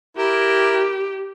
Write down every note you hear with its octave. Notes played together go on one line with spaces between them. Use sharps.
E4 G4 A#4